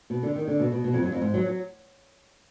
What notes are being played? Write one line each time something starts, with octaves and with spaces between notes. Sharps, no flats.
B2
D3
D#3
D3
B2
B2
B2
F2
F#2
F2
G#2
F#3
F#3